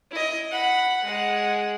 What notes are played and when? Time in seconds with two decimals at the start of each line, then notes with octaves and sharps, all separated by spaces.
0.11 E4 D#5
0.51 F#5 B5
1.04 G#3 F#5